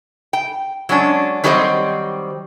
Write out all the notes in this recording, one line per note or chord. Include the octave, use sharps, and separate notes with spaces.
G5
F#3 G#3 C#4 D4
D#3 F#3 G3 C4 C5 D#5